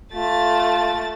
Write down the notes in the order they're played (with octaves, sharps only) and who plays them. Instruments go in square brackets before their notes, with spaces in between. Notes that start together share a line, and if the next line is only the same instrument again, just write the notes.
[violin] A3 A6 [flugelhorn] F4